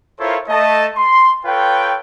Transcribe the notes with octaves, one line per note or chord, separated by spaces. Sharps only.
E4 F4 A4 A#4 C5 C#5
A3 D#5 A5
C6
F4 A4 B4 C#5 G5